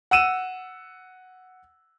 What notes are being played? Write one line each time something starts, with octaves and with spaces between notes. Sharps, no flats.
F#5 E6 D#7 E7